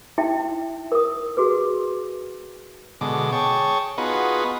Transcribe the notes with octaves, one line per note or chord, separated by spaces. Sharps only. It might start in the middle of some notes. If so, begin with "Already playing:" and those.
D#4 E4 E5 G5
A#4 D#6
F#4 G#4 B4
B2 D3 G#3 D6
G#4 C#5 G5 A5 C#6
B3 D#4 F4 F#4 G#4 B4